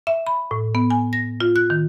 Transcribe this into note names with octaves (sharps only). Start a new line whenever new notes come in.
E5
B5
A2
B3
G#5
A#6
F4
F#6
D#3